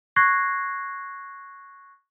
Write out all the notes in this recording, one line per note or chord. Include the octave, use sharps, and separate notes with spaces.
C#6 F#6 G#6 A#6 C7